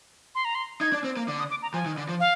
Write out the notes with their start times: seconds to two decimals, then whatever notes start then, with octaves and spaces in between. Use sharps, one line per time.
0.35 C6
0.45 A#5
0.55 C6
0.81 D#4 G#6
0.93 D4
1.04 C4
1.17 A#3
1.28 D3
1.39 D#6
1.50 D6
1.62 A#5
1.74 F3 G#5
1.86 D#3
1.98 D3
2.09 F3
2.20 F5